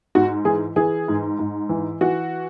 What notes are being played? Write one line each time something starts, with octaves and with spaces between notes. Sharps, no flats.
G#2 F#4
E3 G#4
E3 G#4
G#2
G#2
E3
E3 F#4